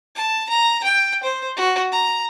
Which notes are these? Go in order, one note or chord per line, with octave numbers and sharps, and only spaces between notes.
A5
A#5
G5
C5
F#4
A#5